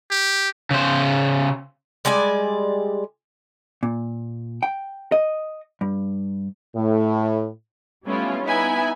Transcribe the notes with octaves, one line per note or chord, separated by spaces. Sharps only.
G4
C#3 C5
G3 G#3 D5 G#5
A#2
G5
D#5
G2
A2
G3 A3 B3 C#4 E4 F4
B3 D#4 E4 E5 G#5 B5